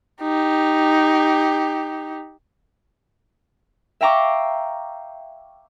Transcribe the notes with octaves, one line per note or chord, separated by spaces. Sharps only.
D#4 G4
E5 F5 G5 A#5 C#6 D6